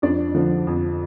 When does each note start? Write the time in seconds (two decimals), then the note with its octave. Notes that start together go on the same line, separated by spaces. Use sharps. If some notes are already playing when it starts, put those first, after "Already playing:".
0.02 F2 D4 D5
0.35 D3 F3
0.67 F2